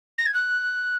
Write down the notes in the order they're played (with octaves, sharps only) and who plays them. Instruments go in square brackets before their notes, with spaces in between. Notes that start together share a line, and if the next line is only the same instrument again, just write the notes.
[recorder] A#6
G#6
F#6